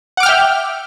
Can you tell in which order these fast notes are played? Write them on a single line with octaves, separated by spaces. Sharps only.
F#5 D6 F6 G5 E5